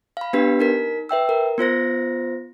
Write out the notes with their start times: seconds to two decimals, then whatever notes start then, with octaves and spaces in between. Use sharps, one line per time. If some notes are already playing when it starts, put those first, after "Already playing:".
0.17 F5 B5
0.33 B3 D4 G4 B4 B6
0.60 D#4 A#4 B6
1.09 B4 E5 G5 E6
1.29 A#4
1.58 B3 F4 C5 A#6